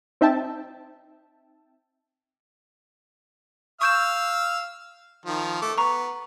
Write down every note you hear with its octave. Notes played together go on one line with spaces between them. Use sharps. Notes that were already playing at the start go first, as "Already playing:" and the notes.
C4 D#4 E5 G5 A5
F5 C#6 E6 F6 G6 E7
D#3 F3
A3 D6
B3 A#5 C#6